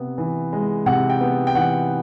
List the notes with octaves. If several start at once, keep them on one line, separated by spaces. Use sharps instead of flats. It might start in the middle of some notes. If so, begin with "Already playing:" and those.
Already playing: C3 B3
E3
G#3
C3 F#5
G5
B3
G5
E3 F#5